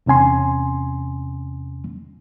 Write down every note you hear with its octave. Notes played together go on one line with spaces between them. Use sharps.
E2 C3 C#4 G#5 C6